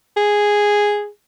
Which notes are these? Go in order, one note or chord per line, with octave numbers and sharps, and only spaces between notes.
G#4